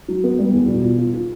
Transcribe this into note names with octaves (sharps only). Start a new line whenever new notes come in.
F#3
B3
G3
E2
B2
F4
F4
F4